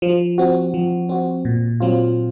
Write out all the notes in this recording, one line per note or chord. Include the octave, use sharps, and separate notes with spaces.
F3
C4 F#4
F3
C4 F#4
A#2
F#3 C4 F4